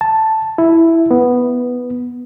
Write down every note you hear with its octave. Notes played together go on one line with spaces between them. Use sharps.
A5
E4
B3